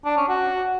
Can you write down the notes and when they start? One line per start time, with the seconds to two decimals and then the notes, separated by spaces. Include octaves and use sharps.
0.05 D4
0.17 C#4
0.29 F#4